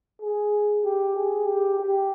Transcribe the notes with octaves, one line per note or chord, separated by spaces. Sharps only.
G#4
G4
G#4
G4
G4